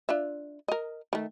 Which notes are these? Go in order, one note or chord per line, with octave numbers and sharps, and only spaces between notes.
D4 F4 E5
A#4 D#5
D#3 A3